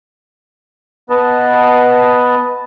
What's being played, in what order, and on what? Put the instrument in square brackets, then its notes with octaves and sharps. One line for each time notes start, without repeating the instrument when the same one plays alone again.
[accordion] B3 B4 D#5 A5